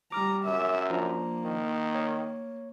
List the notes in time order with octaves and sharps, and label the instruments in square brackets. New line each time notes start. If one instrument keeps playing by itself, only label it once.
[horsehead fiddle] G3 A#5 [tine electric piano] D6 F6
[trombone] F#2 [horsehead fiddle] E5
[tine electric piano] F3 D4 A#5 [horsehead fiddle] A#3
[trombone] D#3
[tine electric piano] C#5